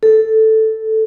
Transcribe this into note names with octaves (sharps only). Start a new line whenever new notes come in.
A4